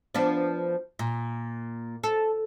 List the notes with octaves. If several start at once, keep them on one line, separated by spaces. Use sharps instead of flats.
F3 B3 D4
A#2
A4